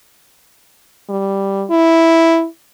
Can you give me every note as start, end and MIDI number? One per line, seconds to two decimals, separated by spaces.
1.09 1.65 55
1.70 2.46 64